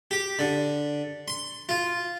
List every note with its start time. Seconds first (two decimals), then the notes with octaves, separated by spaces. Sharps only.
0.11 G4
0.39 D3
1.28 C6
1.69 F4